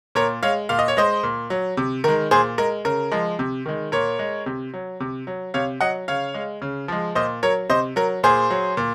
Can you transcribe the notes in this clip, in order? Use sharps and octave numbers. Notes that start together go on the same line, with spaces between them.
A#2 A#4 C#5
G#3 C#5 F5
A#2 F5
D#5
C#5
G#3 C5 D#5
A#2
F#3
C3
D#3 G#3 A#4
A#2 G#4 C5
G#3 A#4
C#3 A#4
F3 G#3
C3
D#3 G#3
A#2 A#4 C#5
G#3
C3
F#3
C3
F#3
C3 C#5 F5
F#3 D#5 F#5
C#3 C#5 F5
G#3
C#3
F3 G#3
A#2 C5 D#5
F#3 A#4 C#5
C3 C5 D#5
F#3 A#4
A#2 G#4 C5
F#3
A#2